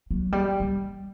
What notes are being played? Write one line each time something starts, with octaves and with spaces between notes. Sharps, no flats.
F#3
G3
G3